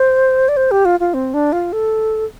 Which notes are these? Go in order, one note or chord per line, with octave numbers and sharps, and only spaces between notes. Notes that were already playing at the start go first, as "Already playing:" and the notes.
Already playing: C5
D5
C5
G4
F4
F4
C4
D4
F4
A4